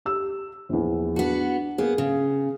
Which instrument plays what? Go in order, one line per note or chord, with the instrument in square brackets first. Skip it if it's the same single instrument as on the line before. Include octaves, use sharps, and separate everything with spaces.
[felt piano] G4 E6
A#1 E2
[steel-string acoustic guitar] B3 F#4 [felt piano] D4
[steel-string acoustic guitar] A#3 B3 [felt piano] G#4
[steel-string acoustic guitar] C#3